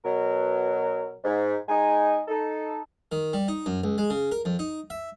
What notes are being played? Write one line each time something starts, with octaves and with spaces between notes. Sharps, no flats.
B2 F#3 A#4
G#2
G#3 D#4 G#5
D#4 A4
D#3
G3
D#4
F#2
C#2
G#3
C#3
A#4
F2
D#4
E5